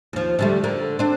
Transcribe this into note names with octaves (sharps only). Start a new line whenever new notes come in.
D#2 F3
D3 G3 A3
D3 A#4
C4 D4